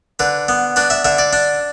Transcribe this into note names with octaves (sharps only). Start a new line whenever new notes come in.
D3 B4
B3
D4 B4
E5
D3 E5
D5
D4